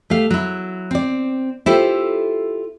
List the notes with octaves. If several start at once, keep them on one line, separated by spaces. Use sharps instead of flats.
A3 G4 F5
F#3 E4
C4 D5
E4 F4 G4 A4 C5